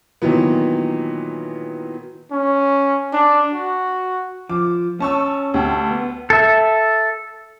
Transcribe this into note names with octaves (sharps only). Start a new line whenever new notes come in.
A#2 D#3 E3 F#3 B3
C#4
D4
F#4
F3 D6
C#4 A5 C#6 E6
D2 G4 A5
B3
A4 E5